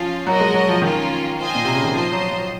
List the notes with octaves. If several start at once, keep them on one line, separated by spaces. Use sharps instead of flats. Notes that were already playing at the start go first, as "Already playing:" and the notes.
Already playing: F3 C#4 F4 F5
F#3 F#4 A#4 D#5
G#3
F#3
F3
D#3 A#3 C#4 F4
F4 C5 D#5 G#5
A#2
C3
C#3
D#3
F3 F4 C5 D#5
F#3
F#3